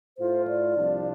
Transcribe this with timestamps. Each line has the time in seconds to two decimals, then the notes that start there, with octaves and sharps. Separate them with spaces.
0.18 A2 A3 F4 C5
0.48 D5
0.76 C2 C3 F3 D4 F4